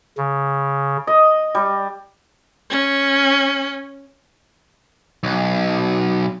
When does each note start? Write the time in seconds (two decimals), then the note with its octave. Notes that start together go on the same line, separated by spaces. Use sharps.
0.17 C#3
1.07 D#5
1.55 G3
2.70 C#4
5.23 B1